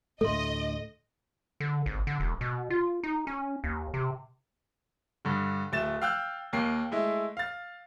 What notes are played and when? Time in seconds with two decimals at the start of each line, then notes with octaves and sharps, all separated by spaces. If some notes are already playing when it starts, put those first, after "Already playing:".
0.21 D2 A2 A3 A4 D#5 C6
1.60 D3
1.86 G#1
2.07 D3
2.20 E1
2.41 B2
2.70 F4
3.03 D#4
3.27 C#4
3.64 D#2
3.94 C3
5.25 G2 D3
5.72 D1 A3 A6 E7
6.02 F5 G5 E6 F#6 G6
6.53 D#2 A#3 C7
6.92 G#3 A3 E4
7.37 F5 A6